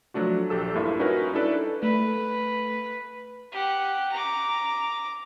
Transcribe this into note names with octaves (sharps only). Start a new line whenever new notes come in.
F3 F#3 A3 D4 F#4
A#1 G4 A4 E6
G2 A#3 E4 F4 E5
C#4 D#4 F#4 A#4 B4
D4 E4 A4 B4 D5
A3 B4
G4 F#5
A#5 D6